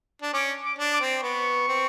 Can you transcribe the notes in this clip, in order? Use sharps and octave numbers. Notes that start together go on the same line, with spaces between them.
D4
C#4 D6
D6
D4
D6
C4
B3 C#6
C4